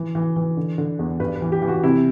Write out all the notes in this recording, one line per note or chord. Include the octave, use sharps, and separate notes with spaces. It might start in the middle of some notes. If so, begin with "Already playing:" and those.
Already playing: E3
E3
E3
D3
D3
E2
G2 B4
B4
E3
G4
E3
F#4
C3 E4